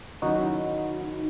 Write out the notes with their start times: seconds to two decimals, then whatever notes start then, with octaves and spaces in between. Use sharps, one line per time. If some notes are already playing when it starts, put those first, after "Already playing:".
0.22 D#3 F#3 C#4 D#4 E4 F#4